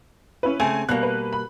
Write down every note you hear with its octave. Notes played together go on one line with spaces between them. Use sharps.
C#4 E4 B4
C#3 A3 C4 G#5
B2 G3 A#3 F#6
B4
B5